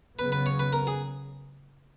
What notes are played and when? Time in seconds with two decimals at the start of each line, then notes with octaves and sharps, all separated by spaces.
0.19 C#3 F#3 B3 B4
0.32 B4
0.46 C#5
0.59 B4
0.73 A#4
0.87 G#4